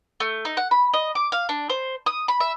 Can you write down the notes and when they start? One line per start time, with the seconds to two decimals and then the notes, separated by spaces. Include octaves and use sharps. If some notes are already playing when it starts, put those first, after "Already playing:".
0.20 A3
0.45 D#4
0.57 F#5
0.71 B5
0.93 D#5
1.15 D6
1.32 F5
1.49 D4
1.70 C5
2.06 D#6
2.28 B5
2.40 E5